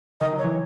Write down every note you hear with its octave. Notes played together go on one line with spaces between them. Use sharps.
D#3 D#5
F#3
C#5
E3